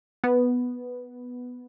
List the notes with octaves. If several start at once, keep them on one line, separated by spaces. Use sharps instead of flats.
B3